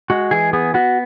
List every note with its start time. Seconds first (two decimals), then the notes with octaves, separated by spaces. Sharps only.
0.10 G#3 F#4
0.31 E3 G#4
0.53 B3 G#4
0.74 B3 F#4